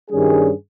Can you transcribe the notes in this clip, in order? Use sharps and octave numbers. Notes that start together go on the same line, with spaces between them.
G2 D#3 G3 C#4 G#4